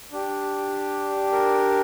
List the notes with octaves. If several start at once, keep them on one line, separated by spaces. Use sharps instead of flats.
D4 G4
A#4